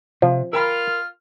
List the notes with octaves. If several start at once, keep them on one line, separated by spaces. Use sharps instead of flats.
C3 F3
F4 A#4 G5 B5 F6